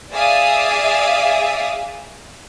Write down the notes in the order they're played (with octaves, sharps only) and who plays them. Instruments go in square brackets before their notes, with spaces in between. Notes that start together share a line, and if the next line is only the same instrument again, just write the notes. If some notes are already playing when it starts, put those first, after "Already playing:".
[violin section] G#4 D5 E5 F5 D#6